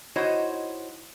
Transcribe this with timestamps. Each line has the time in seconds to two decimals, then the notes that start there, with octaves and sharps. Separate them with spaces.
0.16 D#4 E4 F#4 C5 C#5 D#5